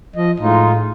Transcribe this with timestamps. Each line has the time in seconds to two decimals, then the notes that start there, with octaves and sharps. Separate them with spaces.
0.16 F3 D#5
0.40 A2 G#3 D#4 F4